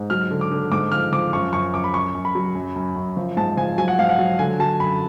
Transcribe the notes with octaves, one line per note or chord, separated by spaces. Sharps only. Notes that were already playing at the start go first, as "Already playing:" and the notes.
Already playing: G#2
F#3 F6
D3
D6
D3
G#2 D6
F3 F6
F3 D6
F#2 C#6
F#2 C#6
F#2 D6
B5
F#2 C#6
F#2
B5
F#3
F#2
F#2
F#2
F3
G#2 A5
F3 G#5
F#3 G#5
F#5
G#2 F5
F#5
F#3
D3 G#5
F#3 A5
F#2 B5